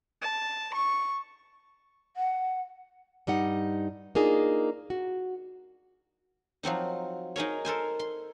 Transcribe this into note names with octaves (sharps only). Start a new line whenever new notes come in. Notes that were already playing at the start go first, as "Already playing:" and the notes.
A5
C#6
F#5
G2 G3 D#4 F#5
A#3 D4 D#4 F4 G#4
F#4
F3 F#3 C4 D#4
D#4 G#4 A#4 C#5
A4 A#4 C5 G#5
C6